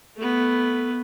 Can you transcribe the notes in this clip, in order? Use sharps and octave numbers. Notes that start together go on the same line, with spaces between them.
A3 B3